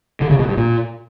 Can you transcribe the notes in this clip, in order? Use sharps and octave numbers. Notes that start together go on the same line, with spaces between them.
D3
C#3
B2
G2
A#2